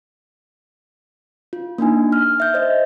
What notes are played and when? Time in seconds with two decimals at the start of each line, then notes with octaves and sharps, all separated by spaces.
1.53 F4
1.78 A#3 D4 D#4 G#5
2.12 F6
2.40 E5 G6
2.54 C5 D#5 E5